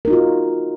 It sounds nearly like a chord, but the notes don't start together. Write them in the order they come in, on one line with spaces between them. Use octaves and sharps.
A#4 D#4 F#4 F4